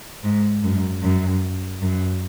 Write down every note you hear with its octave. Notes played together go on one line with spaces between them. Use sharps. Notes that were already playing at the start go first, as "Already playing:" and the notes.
G#2
F#2
F#2
F#2